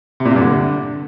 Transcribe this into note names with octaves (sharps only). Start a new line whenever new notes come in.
C3
A#2
C3
G2
D3